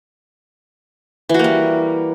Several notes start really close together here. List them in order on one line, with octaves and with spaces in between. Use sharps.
E3 F#4 A#3 G3